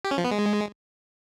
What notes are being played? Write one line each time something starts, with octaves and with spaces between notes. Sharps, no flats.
G4
C#4
F3
B3
G#3